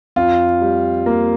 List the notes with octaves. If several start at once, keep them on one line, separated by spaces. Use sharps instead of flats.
F2 F4
G3
A#3